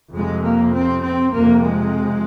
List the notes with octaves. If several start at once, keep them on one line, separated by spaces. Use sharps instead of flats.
F2 C3 G#3
A#3
C4
C4
F2 C3 A#3
G#3